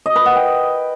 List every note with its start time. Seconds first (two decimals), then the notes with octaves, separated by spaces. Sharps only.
0.06 D#5
0.16 B4
0.26 F#5
0.36 G5